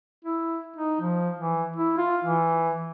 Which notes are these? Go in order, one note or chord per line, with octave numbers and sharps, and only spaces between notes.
E4
D#4
F3
E3
E4
F4
E3